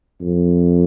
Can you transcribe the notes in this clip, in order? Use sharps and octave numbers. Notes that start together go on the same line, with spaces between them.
F2